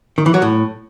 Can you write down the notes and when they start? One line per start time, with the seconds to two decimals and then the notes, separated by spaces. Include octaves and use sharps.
0.18 D#3
0.26 E3
0.34 F#3
0.42 A2